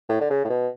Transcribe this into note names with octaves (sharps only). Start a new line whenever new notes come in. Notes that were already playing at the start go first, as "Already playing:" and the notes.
A2
D3
C#3
A2
B2